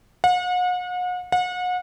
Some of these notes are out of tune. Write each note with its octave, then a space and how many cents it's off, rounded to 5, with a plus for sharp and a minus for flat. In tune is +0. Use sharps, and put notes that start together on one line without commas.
F#5 -40
F#5 -35